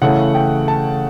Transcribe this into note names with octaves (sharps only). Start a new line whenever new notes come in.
C#3 E3 A3 F#5
G5
A5